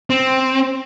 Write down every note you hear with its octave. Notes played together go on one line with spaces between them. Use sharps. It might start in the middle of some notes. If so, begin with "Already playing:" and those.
C4